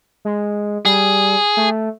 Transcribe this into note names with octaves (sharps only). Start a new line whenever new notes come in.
G#3
G3 G#4
A3